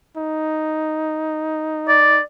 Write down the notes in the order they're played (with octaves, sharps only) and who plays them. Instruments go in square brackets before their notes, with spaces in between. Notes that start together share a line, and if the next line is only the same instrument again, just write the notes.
[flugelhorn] D#4
[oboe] D5